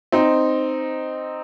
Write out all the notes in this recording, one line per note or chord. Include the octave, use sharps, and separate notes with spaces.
C4 D#4